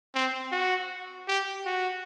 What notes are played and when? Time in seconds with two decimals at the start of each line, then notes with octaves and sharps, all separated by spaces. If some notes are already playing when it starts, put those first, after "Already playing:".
0.15 C4
0.52 F#4
1.28 G4
1.66 F#4